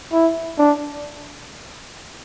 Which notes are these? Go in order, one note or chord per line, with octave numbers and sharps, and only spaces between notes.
E4
D4